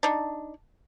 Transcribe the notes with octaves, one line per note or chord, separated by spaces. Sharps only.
D4 D#4